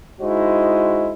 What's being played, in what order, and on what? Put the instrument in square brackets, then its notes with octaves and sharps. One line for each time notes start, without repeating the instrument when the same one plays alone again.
[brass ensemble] G#3 D#4 E4 F#4 C5 D#5